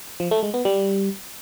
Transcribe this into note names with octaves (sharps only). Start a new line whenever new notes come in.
F3
A3
G#3
B3
G3